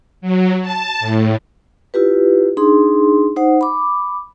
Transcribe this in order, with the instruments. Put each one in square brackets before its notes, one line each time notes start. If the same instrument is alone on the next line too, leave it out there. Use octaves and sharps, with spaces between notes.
[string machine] F#3
A5
A2
[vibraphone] E4 F4 G4 B4
D4 D#4 G#4 C6
D#4 C5 F#5
B5 D6